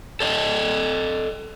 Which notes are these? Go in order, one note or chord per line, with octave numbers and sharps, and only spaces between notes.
A4 D5 D#5